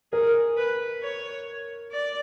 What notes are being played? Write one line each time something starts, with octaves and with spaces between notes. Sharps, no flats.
G#4 A#4
B4
C#5
D5